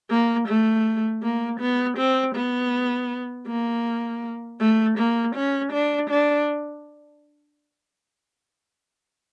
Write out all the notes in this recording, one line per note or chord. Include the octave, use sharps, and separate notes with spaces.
A#3
A3
A#3
B3
C4
B3
A#3
A3
A#3
C#4
D4
D4